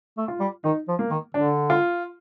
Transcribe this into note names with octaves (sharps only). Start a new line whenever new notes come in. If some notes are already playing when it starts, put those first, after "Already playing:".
A3
F4
G3
D#3 D#4
F3
A#3
D#3
D3 D4
F4